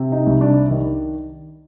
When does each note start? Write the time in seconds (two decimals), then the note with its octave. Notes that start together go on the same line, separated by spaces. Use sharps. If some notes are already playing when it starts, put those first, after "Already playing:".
Already playing: C3
0.12 D#4
0.26 C2
0.41 D4
0.71 D#3